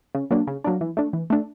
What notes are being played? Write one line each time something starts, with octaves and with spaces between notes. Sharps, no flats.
C#3
F#3 A#3 D4
C#3
F#3 A#3 D4
E3
A3 D4
E3
A3 D4